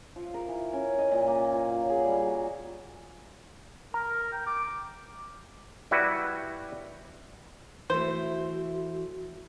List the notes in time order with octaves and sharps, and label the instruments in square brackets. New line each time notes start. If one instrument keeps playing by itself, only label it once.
[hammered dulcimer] F3
A#4
E3
C#4
D#5
A#2
A#3
F3
F#3
G#4
G3
F#4
[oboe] A#4 [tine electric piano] A#5
[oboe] G5
D6
[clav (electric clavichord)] G3 E4 F#4 B4
[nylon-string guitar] E3 A3 [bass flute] F#4 [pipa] C5